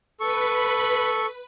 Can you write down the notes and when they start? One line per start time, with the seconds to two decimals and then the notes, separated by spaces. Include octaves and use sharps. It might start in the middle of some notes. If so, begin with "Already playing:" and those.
0.20 A4 B4 B5 C#6